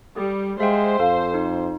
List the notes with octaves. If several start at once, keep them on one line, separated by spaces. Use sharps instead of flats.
G3 A4
G#3 C5 E5 F5 G5
F2 A4 F5 G#5 A#5
D#4